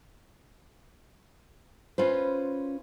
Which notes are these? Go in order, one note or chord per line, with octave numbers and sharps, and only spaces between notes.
C#4 F4 B4 C5